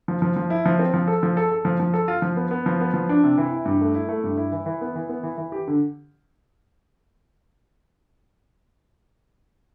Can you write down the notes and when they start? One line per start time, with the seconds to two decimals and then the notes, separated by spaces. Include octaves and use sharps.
0.08 F3
0.22 F3
0.36 F3
0.50 E4
0.66 F3
0.79 C4
0.94 F3
1.08 A4
1.23 F3
1.37 A4
1.52 A4
1.65 F3
1.80 F3
1.94 A4
2.08 F4
2.22 F3
2.37 B3
2.51 B3
2.66 F3
2.81 B3
2.94 F3
3.09 D4
3.24 C3
3.38 E3
3.51 E4
3.65 G2
3.81 A3
3.95 E4
4.09 A3
4.24 G2
4.37 E4
4.52 E3
4.66 E3
4.81 B3
4.95 E3
5.09 B3
5.23 E3
5.38 E3
5.52 G4
5.67 D3